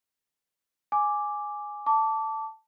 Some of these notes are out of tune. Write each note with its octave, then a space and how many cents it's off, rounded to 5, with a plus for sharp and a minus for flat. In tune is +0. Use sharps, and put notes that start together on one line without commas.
G#5 +0 D6 +0
A5 +5 D6 -20